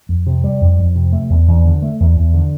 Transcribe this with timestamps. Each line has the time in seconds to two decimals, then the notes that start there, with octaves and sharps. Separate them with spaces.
0.09 F2
0.27 C3
0.44 G3
0.61 F2
0.79 F2
0.96 C3
1.12 A3
1.30 E2
1.48 E2
1.65 D3
1.82 A3
2.00 E2
2.16 E2
2.34 D3